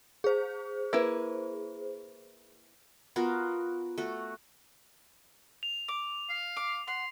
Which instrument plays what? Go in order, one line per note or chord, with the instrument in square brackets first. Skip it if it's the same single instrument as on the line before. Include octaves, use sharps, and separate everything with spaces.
[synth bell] G#4 C5
[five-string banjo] A#3 E4 B4
[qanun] B3 F4 F#4 A#4
A3 F#4
[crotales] F7
[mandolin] D6
[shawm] F5
[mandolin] D6
[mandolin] F#5 [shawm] C6